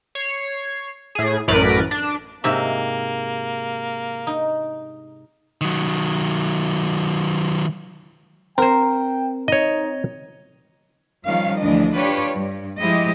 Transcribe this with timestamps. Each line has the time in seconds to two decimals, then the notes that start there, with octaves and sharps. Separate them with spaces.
0.15 C#5 C7
1.15 A2 G#4
1.48 A1 F#2 A2 A#4 B4 D5
1.91 D4
2.44 G#2 C3 A#3 E5
4.27 D#4
5.61 D#3 F#3
8.58 C4 A#4 C5 G5
9.48 D#4 C#5 D#5
11.26 D#3 F3 G3 C#4 F5
11.60 D2 E3 F3 D4 D#5
11.95 D4 F4 G4 B4 C#5
12.34 G2
12.78 F3 G#3 E4 G4 D#5